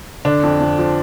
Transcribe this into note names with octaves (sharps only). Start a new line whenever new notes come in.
D3 D4
F2
F2
F3